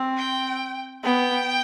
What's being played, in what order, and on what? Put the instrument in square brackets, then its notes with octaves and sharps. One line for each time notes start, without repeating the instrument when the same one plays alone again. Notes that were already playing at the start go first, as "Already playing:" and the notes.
Already playing: [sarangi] C4
[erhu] G5
[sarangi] B3 [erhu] G5